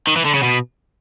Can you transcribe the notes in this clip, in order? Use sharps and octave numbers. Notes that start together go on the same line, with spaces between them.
D#3
E3
D3
C#3
B2